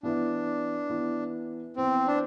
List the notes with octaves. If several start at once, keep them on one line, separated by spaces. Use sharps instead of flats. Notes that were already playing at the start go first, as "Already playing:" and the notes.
E3 B3 D4 E4
E3 B3 E4
E3 B3 C4 E4
D4